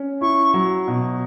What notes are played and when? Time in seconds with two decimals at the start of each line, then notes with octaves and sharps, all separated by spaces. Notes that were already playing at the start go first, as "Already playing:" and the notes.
Already playing: C#4
0.21 E4 C#6
0.54 F#3
0.88 B2